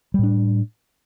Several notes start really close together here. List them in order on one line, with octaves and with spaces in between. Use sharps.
G3 A2 D4